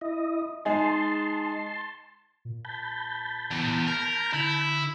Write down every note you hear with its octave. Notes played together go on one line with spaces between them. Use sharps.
E4 D#5
G#3 D#4 G#4 A5 C6
A#2
A5 B5 G6
E2
A#4
D3 E4